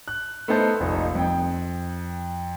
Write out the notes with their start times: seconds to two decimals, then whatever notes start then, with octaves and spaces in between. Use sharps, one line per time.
0.08 F#6
0.48 A3 B3 D#4 C5 A5
0.80 F1 A#1 D#4
1.15 F2 G5